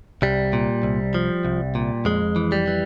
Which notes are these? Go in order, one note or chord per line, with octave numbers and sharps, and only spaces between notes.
C2 G3
A#2
C2
F3
C2
A#2
F2 G#3
E3
G3
E3